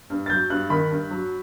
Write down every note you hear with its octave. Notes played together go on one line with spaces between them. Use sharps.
G2
A6
F#3 G6
G2 F#6
D#3 B5
G2
F#3